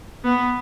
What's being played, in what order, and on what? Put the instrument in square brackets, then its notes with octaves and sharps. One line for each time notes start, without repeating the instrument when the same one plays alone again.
[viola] B3